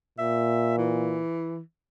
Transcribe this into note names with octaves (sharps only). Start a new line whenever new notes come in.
A#2 E5
E3